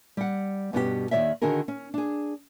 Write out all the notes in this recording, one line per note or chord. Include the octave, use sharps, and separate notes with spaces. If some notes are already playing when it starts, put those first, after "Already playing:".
G3 F#5
G2 B2 B3 C#4 F#4 G4
D#2 D#3 F#3 C#5 D5 E5
D3 D#3 C#4 F#4 G#4 A#4
C#4
D4 G#4